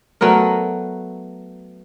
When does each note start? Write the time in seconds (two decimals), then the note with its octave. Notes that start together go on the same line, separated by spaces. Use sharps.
0.21 F#3 A3 B3 A#4